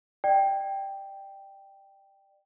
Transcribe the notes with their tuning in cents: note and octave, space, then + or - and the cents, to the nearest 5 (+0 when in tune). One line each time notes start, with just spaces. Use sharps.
D5 +35 G5 +0